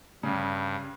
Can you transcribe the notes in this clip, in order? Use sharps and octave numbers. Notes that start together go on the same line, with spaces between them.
G2 C#3